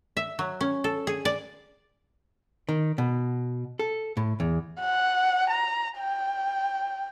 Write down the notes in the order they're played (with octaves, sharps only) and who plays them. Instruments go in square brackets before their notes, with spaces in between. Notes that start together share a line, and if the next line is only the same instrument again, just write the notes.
[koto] E5
F#3
C#4
A4
G#4
D5
[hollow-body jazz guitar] D#3
B2
A4
A2
E2
[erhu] F#5
A#5
G5